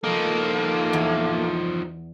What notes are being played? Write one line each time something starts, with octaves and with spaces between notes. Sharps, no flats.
F3 A#3 D#4 A4
E2